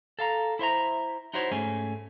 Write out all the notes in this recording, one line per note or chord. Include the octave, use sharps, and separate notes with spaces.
A4 F5 A#5
E4 C5 E5 A#5
D#4 E4 F#4 C5 C#5 E5
G#2 A3 C#4 G#4